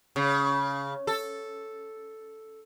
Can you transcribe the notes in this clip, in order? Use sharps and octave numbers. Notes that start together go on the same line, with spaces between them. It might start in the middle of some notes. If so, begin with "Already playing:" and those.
C#3
A4